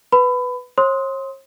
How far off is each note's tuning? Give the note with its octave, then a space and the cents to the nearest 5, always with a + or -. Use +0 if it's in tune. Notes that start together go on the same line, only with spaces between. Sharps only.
B4 +5 B5 +25
C#5 -45 C6 +0 D#6 +30